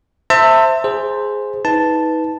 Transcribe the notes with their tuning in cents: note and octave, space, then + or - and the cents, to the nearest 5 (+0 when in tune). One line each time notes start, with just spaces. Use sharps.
C5 +0 E5 +0 A5 +35
G#4 +0 C5 +0
D#4 +35 B4 +0 A5 +0